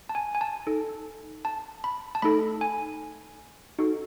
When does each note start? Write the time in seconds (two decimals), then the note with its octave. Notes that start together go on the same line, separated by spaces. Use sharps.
0.09 A5
0.15 G#5
0.35 G#5
0.41 A5
0.67 D#4 A4
1.45 A5
1.84 B5
2.15 A5
2.22 A3 D#4 A4 B5
2.61 G#5
3.79 D#4 F#4 A4